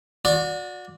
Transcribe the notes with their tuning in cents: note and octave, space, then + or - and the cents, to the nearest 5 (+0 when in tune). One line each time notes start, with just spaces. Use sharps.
F#4 -30 D5 +0